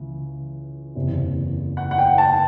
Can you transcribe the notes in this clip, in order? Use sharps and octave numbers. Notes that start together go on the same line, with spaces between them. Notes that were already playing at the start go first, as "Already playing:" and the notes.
Already playing: C#2 C#3 E3
F#1 E2 C3
F#5
F#5
G5
A5